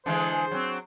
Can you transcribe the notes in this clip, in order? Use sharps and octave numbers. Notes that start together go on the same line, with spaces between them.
D3 E3 G#3 C5
F#3 C4